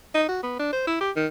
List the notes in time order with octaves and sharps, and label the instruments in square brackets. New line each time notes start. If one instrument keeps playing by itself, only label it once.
[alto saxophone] D#4
F#4
B3
D4
C5
E4
G4
D#3